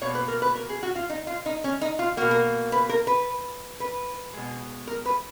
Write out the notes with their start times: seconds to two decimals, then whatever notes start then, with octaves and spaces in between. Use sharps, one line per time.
0.01 B2 A#3 C#5
0.15 B4
0.28 A#4
0.42 B4
0.55 A#4
0.69 G#4
0.83 F#4
0.95 F4
1.10 D#4
1.27 F4
1.46 D#4
1.64 C#4
1.81 D#4
1.99 F4
2.17 A#3 F#4
2.21 B2
2.31 A#4
2.72 B4
2.89 A#4
3.07 B4
3.80 B4
4.33 B2 G#3
4.87 A#4
5.06 B4